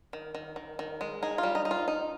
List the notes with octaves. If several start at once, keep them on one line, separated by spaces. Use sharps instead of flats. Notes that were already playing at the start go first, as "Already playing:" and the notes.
D#3
D#3
D#3
D#3
G#3
D#4 G#4
F4
G3
D#4
D#4
F4
D#4